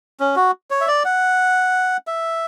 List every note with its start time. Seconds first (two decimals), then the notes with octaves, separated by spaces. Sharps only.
0.20 C#4
0.36 F#4
0.71 C#5
0.81 E5
0.88 D5
1.05 F#5
2.07 E5